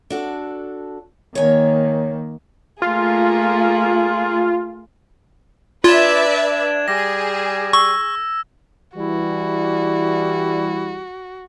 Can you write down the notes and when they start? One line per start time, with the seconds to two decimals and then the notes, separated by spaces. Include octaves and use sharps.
0.10 D4 F#4 A4
1.35 D#3 A#3 C#5 G#5
2.82 A3 A#3 F4 G#4
5.84 D4 F4 B4 D5 E5 G#6 E7
6.88 G3 G#4 A#6
7.73 C#6 E6
8.96 E3 G3 E4 F#4